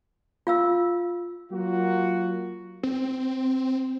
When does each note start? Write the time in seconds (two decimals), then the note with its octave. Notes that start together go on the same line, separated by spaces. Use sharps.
0.47 F4 F5 E6
1.52 F#3 A#3 F4 F#4
2.83 C4